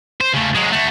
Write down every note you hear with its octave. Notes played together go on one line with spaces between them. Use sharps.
C5
C#3 A3
F#3 G#3
A3 F#4